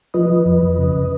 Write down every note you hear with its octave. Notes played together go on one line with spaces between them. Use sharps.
F3 B4 D#5
F3
F2
F2
C#3